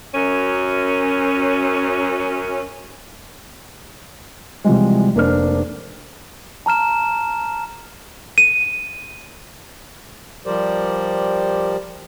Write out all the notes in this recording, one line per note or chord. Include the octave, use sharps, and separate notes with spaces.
F#2 C#4
C3 E3 F3 G3 G#3
F1 A#3 D4 C5 F6
A5 A#5 F6 E7
D#7
F3 G3 G4 A#4 C5 D5